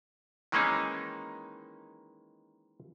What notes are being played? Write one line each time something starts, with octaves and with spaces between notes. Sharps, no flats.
D#3 E3 G#3 A#3 C#4 D#4